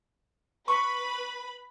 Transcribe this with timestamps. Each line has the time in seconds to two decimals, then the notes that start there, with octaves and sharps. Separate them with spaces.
0.68 B4 B5 C#6